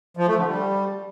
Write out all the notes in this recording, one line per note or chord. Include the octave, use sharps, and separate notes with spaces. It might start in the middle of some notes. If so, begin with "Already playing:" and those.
F3
A3
D3
G3